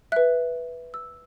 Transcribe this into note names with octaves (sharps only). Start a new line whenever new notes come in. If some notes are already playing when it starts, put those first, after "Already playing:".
B4 E5 F#6
E6